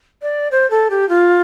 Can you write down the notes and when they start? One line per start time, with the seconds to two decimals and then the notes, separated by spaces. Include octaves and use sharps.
0.22 D5
0.51 C5
0.70 A4
0.90 G4
1.09 F4